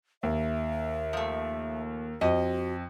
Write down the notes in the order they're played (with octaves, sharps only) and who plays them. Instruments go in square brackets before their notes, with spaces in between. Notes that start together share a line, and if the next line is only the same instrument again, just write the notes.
[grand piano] D#2 [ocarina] E5
[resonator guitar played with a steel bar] F3 A3
[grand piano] F2 [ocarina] F#4 [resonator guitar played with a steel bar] D#5